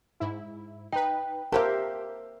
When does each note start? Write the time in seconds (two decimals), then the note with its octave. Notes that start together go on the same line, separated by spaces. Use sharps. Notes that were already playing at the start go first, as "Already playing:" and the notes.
0.20 G#2 E4
0.93 D#4 B4 G5
1.52 A#3 F4 G4 A4 A#4 C5 E5